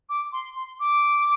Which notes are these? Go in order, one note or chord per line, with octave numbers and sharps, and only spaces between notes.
D6
C6
C6
D6